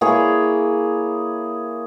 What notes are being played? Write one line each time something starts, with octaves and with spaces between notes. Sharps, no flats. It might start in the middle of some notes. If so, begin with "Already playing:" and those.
A#3 E4 G#4 C#5